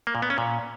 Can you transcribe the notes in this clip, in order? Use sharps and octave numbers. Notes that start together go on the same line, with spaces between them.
A#3
A#2
B3
C#4
A#2